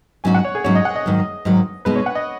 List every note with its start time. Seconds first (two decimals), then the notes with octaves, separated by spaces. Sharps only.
0.24 G#2 F#3 C#4 F#4 G#5
0.34 F#5
0.45 C#5
0.55 G#4
0.64 G#2 F#3 C#4 F#4 C#5
0.75 D#5
0.85 F#5
0.95 D#5
1.06 G#2 D#3 F#3
1.45 G#2 D#3 F#3
1.85 B2 G#3 B3 D#4 B4
1.96 C#5
2.06 F#5
2.15 D#5